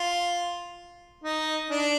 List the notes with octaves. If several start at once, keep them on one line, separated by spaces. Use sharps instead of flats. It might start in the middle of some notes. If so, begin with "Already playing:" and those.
Already playing: F4
D#4
D4